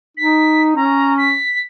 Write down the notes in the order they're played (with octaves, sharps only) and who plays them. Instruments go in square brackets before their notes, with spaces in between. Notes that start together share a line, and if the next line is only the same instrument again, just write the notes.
[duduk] D#4 [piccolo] B6
[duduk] C#4 [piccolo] A#5
[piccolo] B6